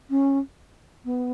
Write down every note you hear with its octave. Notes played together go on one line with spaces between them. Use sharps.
C#4
B3